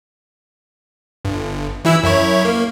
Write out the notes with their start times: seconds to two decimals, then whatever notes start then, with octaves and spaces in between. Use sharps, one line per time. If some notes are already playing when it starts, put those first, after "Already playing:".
1.25 G1
1.85 E3 E4 E6
2.03 F#2 E4 C#5
2.45 A#3